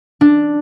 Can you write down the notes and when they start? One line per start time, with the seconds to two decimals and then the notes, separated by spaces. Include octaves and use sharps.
0.21 D4